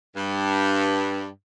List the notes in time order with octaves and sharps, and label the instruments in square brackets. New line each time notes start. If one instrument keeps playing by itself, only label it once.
[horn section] G2